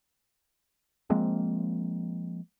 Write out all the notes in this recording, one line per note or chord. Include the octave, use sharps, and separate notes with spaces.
F3 G#3 A#3 C4